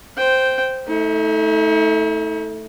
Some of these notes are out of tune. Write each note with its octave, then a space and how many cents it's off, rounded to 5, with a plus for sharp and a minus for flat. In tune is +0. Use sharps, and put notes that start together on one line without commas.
C5 +0 G5 -5
A3 +0 D#4 +45